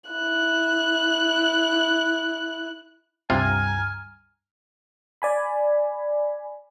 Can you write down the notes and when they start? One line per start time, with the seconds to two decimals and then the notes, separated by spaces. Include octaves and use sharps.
0.11 E4 F#6
3.30 C#2 G2 C3 F4 G#5 A#5 F6
5.22 D5 G#5 B5